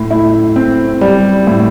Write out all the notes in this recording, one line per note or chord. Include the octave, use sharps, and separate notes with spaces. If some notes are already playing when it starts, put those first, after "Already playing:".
Already playing: A2
E4
C4
G3
A2